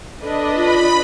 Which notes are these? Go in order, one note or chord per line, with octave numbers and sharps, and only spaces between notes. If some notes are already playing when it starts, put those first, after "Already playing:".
D4 A4 B4 D#5
F4 B5